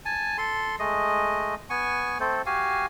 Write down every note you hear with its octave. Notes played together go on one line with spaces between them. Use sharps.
G#5 A5
A4 C6
G#3 A3 D#5
B3 G#5 C#6
A3 C4 A4 C5
F#4 G4 F5 G#5